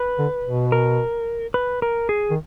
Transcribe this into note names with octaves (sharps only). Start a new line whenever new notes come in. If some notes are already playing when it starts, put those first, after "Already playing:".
Already playing: B4
D3
B2
A#4
B4
A#4
G#4
D#3